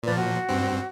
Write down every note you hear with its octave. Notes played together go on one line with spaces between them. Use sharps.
A#2 F3 B4 D5
F#4
G2 C4